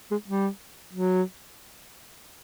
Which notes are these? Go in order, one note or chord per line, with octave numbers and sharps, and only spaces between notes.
G#3
G3
F#3